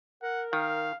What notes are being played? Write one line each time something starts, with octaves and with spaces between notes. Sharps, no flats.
A#4 F#5
D#3 F5